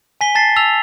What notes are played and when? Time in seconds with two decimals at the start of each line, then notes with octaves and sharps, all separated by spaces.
0.21 G#5 B6 G7
0.35 A5 A6 B6 C7
0.56 A5 E6 F7